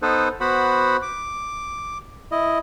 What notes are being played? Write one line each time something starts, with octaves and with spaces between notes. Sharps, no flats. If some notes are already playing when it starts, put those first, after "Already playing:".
B3 D#4 A4 B4 C5
B3 F#4 C5 F#5 B5
D6
E4 D#5